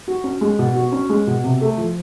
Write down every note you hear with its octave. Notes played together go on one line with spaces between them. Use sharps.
F#4
C#4
G#3
B2
F#4
C#4
G#3
B2
C3
A3
F3